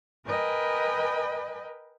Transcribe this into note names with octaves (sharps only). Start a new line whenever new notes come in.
A#4 B4 D#5 G5 G#5 B5